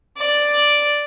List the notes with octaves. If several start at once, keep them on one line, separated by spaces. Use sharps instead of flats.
D5